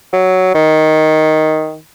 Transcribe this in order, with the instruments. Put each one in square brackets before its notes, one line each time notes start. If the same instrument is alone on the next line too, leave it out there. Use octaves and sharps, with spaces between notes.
[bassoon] F#3
D#3